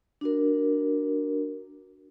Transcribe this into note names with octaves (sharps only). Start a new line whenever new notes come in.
D4 F#4 A#4